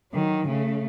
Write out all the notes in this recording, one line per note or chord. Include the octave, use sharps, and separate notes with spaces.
D#3 F#3
C#3 A3